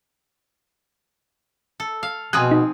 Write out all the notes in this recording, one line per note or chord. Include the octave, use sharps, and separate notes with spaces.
A4
F5
B2 F3 C4 G#4 G#5 D#6 F#6
D#4